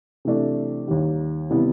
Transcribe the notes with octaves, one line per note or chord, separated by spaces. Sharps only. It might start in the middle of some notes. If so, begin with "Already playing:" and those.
C3 E3 A3 D4
D#2 D#3 G3
C3 E3 G3 B3 E4